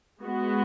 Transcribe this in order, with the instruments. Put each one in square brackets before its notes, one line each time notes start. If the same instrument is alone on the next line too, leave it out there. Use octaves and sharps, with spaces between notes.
[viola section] G#3 B3 F#4